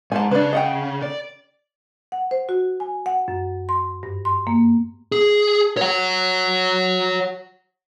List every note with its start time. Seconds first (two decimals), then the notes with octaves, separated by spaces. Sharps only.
0.12 G#2 G#5 A5
0.31 C#3 D4 B4
0.53 D#5 F#5 G5
1.02 D5
2.12 F#5
2.31 C5
2.49 F#4
2.80 G#5
3.06 F#5
3.28 F#2
3.69 C6
4.03 G2
4.25 C6
4.47 A#3
5.12 G#4
5.77 C#5 F#5